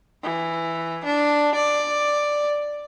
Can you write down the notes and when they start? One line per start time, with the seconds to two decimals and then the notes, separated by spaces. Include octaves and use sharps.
0.23 E3
1.05 D4
1.55 D5